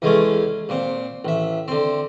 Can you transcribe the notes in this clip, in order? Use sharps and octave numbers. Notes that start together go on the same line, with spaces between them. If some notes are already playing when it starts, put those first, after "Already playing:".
E2 G#3 A3 C#4
A#2 C4
A1 E5
D3 C4